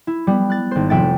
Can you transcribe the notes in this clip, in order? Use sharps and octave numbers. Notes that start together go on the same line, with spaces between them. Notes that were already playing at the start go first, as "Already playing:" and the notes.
E4
G3 B3
F#6 A6
G#1 C5
F1 E5 F#5 G5 A6